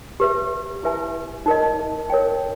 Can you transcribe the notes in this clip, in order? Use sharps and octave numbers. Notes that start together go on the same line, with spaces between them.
G4 B4 E5
E4 G4 B4 E5 G#5
D#4 A#4 D#5
A#4 C#5 G5